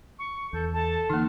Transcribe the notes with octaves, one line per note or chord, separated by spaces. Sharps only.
C#6
E2 A4 G6
A4 A5
D3 E3 A#3 D#4 F6